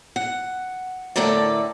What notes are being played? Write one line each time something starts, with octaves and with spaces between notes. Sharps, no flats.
F#5
A2 D3 A3 A4 A#4 D5